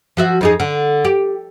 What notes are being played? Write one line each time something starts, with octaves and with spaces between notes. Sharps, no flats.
F3 F#4 E5
F2 D#4 G#4
D3
G4